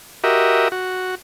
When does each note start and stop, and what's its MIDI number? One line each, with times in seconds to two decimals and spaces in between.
0.24 0.68 66
0.24 0.68 67
0.24 0.68 70
0.24 0.68 75
0.24 0.68 76
0.72 1.15 66